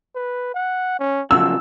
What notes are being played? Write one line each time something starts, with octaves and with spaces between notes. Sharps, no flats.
B4
F#5
C#4
F#2 C#3 F3 F#4 E6